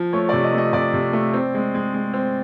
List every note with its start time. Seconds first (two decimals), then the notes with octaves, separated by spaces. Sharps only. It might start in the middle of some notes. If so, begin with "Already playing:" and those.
Already playing: F3
0.13 A3 C#5
0.29 C3 D5
0.44 D#5
0.54 A3 D#5
0.73 C3 D5
0.93 C3
1.13 A3
1.34 C4
1.54 G#3
1.74 G#3
1.94 G#3
2.13 C4